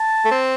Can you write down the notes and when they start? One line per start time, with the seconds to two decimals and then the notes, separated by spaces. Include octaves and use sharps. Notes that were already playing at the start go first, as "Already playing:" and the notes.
Already playing: A5
0.25 A3
0.31 C4